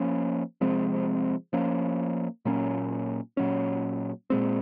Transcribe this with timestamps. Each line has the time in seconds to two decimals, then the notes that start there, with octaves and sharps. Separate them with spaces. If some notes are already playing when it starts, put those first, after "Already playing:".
Already playing: F3 A#3 C#4
0.61 C3 F3 G#3 C4
1.53 F3 A#3 C#4
2.45 A#2 F#3 A#3 C#4
3.37 A#2 F#3 C#4
4.30 A#2 G#3 C4